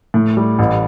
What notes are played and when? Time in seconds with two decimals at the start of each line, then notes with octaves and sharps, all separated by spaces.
0.14 A2
0.37 G3
0.59 A1